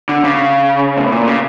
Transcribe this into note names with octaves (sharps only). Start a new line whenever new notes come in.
D3
C#3
A2
A#2
C#3